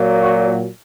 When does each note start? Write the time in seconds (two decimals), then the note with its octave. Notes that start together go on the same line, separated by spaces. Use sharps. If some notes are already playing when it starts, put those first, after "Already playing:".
Already playing: A#2 F#3
0.21 F#4